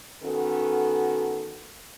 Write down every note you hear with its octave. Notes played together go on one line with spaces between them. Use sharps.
D#3 B3 C#4 F#4 A4